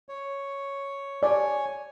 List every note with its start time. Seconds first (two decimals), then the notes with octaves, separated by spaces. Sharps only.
0.09 C#5
1.23 C#5 D5 G#5